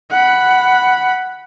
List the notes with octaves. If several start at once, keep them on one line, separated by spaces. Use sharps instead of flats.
F#5 B5